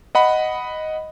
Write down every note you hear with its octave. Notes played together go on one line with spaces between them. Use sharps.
D#5 F#5 B5